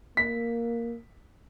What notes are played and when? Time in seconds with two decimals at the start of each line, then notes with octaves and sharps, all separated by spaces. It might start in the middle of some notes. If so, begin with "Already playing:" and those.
0.17 A#3 B6